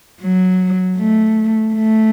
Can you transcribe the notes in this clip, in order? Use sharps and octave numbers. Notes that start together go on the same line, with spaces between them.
F#3
A3
A3